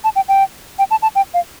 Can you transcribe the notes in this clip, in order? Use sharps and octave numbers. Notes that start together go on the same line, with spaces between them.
A5
G5
G5
G5
A5
A5
G5
F5